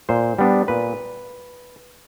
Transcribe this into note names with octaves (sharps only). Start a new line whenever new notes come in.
A#2 C5
G3 B3 D4
A#2 B4